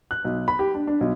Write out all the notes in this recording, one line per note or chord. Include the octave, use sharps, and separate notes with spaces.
F#6
B1
B5
G4
D4
D4
B1